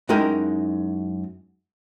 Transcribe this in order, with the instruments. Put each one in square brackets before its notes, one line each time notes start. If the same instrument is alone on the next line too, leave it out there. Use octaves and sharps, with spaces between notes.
[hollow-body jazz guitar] F#2 G#3 D#4 E4 A#4 G5